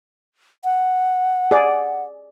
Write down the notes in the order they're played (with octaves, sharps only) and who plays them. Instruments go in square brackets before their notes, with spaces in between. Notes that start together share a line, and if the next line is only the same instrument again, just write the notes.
[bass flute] F#5
[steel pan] G#4 D5